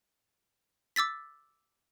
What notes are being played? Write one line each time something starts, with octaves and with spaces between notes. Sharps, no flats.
D6 E6 A6 B6